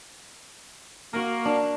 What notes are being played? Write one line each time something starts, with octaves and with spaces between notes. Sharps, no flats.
A#3 F#4 A#4
D4 F5